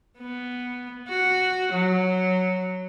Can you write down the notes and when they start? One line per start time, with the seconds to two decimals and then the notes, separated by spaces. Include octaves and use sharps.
0.18 B3
1.08 F#4
1.73 F#3